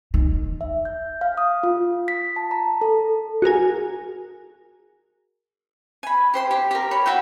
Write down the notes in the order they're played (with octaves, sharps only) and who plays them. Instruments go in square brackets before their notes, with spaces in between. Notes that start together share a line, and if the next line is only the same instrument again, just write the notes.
[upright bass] D#3
[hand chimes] E5
G6
F5
D#6
F4
B6
A5
A#5
A4
[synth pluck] F#4 G#4 A#4 G#5
[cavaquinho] G#5 B5
G4 C5 C6
G4
G4 A#4
C#5 B5
F#4 G4 E5 G5